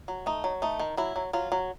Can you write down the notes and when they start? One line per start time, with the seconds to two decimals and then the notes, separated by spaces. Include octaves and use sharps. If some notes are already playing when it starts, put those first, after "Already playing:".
0.08 F#3
0.26 A3 D#4
0.44 F#3
0.62 A3 D#4
0.79 D#3
0.97 F#3 E4
1.16 F#3
1.33 F#3 F4
1.52 F#3